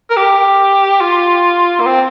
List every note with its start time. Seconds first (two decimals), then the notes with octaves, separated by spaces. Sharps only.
0.10 A#4
0.16 G4
1.01 F4
1.80 A#3
1.86 C4